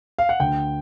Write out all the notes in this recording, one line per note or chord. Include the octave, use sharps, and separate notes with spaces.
F5
F#5
D2 G5